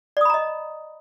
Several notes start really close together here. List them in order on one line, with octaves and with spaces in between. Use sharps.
D5 D#6 B5 A#5 D#5